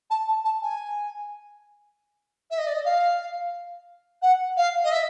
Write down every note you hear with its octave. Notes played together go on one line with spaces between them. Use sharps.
A5
A5
A5
G#5
E5
D#5
D5
D#5
F5
F#5
F5
D#5
E5